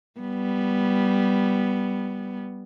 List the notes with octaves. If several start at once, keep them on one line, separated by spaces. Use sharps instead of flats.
G3 B3